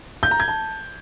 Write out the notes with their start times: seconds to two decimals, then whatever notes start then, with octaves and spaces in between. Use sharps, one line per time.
0.23 G6
0.31 A#5
0.40 G#6
0.48 A5